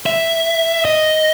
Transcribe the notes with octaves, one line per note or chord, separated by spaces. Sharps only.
E5
D#5